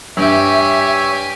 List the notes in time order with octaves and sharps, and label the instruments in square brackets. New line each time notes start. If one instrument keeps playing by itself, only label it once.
[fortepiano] G2 [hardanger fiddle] G4 G#5 [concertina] C#5 E6 [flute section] E5